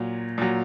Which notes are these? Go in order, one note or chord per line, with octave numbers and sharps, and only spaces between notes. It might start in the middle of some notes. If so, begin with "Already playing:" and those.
Already playing: A#2 F#3
A#2 F#3